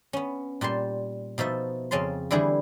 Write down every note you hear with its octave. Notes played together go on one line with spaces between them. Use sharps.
B3 C#4
A#2 G3 A5 C6
B2 F3 D#4 E5 A5
F2 C#3 C#4 A5 C6
D3 E3 G3 E4 G#4